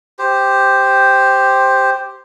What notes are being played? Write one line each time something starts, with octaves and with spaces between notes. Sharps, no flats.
G4 C5